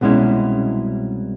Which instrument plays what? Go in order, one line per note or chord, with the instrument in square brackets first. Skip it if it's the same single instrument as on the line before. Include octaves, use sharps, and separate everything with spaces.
[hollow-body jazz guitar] C2 B2 G#3 C#4 E4